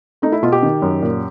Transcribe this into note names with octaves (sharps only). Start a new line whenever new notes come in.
A3 D#4
E4
B2 F4
G4
D#3
F#2
A#2